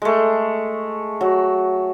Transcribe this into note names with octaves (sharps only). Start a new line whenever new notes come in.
G#3 A3
F#3